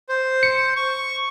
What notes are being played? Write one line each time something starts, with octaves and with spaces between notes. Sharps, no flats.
C5
C#7
C#6